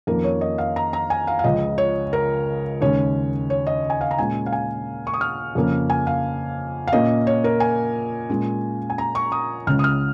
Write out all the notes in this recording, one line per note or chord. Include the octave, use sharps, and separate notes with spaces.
F2 D#3 A#3 C#4 A#4
C#5
D#5
F5
A#5
A#5
G#5
F5
F5
C#2 C#3 F3 D#5
C#5
A#4
D#2 C#3 G#3 C#4 C#5
C#5
D#5
G#5
F5
A#5
A#2 G#3 C#4 G#5
F5
G#5
C#6
D#6
F6
F2 C#3 A#3 C#4
G#5
F5
F5
A#2 A#3 C#4 D#5
C#5
A#4
G#5
A#2 G#3 C#4
G#5
A#5
C#6
D#6
C#2 C#3 G#3 C#4 F6
D#6
F6